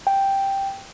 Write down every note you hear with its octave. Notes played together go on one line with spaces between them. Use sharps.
G5